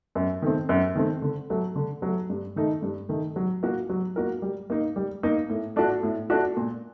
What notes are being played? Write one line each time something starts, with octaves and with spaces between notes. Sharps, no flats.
F#2
D#3 A3 C4
F#2
D#3 A3 C4
D3
F#3 A3
D3
F#3 A3
G2
D#3 A3 D#4
G2
D#3 A3 D#4
F#3
A#3 F#4 A#4
F#3
A#3 F#4 A#4
G3
A#3 D#4
G3
A#3 D#4
A2
A3 D4 F#4
A2
A3 D4 F#4
A#2